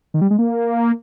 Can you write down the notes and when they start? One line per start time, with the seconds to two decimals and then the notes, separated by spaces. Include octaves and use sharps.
0.14 D#3
0.21 G3
0.30 G#3
0.39 A#3